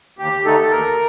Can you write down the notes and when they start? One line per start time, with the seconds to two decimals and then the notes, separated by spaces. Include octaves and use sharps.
0.19 D#2 G4
0.45 D3 A3 D#4 A4
0.71 D#2 A#4